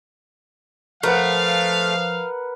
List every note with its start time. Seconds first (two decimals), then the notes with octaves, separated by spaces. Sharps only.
1.03 F3 A3 A#4 B4 F5 F#5